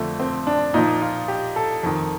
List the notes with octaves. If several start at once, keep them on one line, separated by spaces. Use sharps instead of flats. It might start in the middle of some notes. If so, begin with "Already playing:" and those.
Already playing: F2 D3 F3 A3
C4
D4
A#2 F3 D#4
F4
G4
A4
F2 D#3